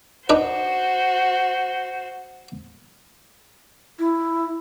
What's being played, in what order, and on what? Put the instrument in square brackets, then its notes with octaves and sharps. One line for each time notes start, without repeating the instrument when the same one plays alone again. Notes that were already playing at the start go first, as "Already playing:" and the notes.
[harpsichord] D4 D#4 B4 [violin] F#4 C5
[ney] E4